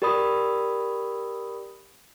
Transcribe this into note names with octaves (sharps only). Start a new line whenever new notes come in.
G4 A#4 D5 B5 D#6